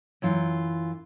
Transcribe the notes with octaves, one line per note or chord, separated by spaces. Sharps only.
F#2 E3 F4